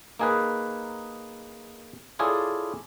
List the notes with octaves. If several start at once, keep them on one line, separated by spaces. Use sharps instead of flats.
A#3 D#4 G#4 A#4 B4
E4 F4 G#4 A4 C#5 D5